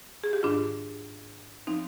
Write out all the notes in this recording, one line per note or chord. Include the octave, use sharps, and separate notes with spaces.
G#4
G4
G#2 D#3 D4 F4
F3 C4 D#4